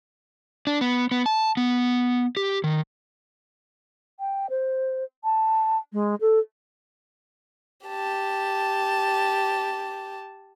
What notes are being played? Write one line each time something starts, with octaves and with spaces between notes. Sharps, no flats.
D4
B3
B3
A5
B3
G4
D#3
G5
C5
A5
G#3
A4
G4 A5